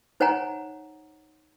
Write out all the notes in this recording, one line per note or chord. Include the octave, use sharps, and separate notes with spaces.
D#4 C5 C#5 F#5 G#5 A#5